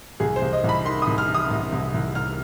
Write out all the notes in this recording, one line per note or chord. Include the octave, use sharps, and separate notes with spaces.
C2 G#4
C5
C2
D#5
C2
B5
D#3 C6
D#6
C2
F6
C3
D#6
C2
C2
C2
C2 F6